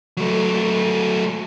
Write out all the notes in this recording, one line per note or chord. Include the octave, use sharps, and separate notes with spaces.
F#3 A3